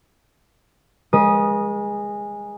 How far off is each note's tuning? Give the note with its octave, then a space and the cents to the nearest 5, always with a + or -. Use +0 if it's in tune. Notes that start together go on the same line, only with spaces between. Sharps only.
G#3 -15 B4 -45 D#6 +0